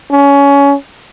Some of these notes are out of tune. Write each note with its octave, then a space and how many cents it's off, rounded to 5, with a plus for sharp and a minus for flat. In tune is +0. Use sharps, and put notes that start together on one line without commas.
C#4 +20